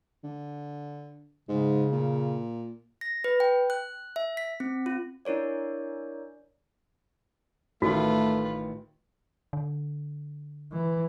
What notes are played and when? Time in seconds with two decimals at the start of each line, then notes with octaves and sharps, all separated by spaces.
0.24 D3
1.49 G#2 C#3
1.92 A#2
3.01 A#6
3.24 B4
3.40 G5
3.70 F#6
4.16 E5
4.37 B6
4.60 C4
4.86 F4
5.25 D4 E4 A#4 C#5 D5
7.82 A1 D#3 A3 F4 F#4 B4
9.53 D3
10.72 E3